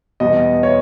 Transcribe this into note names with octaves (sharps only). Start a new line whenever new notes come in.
E2 B2 G3 B3 D#5
C#5